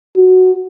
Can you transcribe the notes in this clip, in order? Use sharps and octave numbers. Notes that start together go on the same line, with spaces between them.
F#4